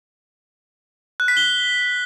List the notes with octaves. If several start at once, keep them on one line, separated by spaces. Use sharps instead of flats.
F#6
B6
G7